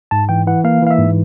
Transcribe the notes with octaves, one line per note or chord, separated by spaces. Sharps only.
G#2 A5
E3 G5
E3 F#5
A#3 F5
E3 F5
E5
G#2